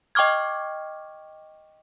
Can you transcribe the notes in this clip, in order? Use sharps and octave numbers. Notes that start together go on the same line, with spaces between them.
D#5 G5 C#6 D6 F6 G#6